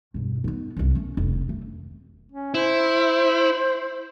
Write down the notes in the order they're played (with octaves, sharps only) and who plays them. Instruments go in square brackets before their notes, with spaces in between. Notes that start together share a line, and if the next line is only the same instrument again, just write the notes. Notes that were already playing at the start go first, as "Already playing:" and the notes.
[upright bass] E1 G2
B3 D#4
C2 D3
A3 C#4
F1 F2
A3
[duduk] C#4
[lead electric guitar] E4 [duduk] C5